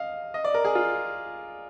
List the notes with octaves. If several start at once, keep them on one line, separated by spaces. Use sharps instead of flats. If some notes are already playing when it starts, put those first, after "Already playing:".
Already playing: D#5 F5
D#5
D5
A#4
G#4
F4